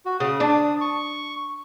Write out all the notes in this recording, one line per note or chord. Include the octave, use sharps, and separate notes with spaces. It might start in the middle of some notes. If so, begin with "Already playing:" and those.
F#4
C#3 D#6
D4
C#6